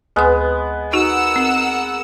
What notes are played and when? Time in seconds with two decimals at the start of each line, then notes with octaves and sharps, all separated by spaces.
0.16 D2 G#3 B3 D#6
0.93 D#4 F#4 A#4 F#5 E6
1.36 C4